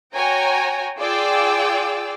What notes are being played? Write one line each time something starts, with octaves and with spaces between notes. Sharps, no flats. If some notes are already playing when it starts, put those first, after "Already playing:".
F#4 C#5 G5 G#5 A#5
F4 G#4 D5 G5 D6 E6